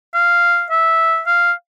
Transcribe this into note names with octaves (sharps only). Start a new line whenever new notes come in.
F5
E5
F5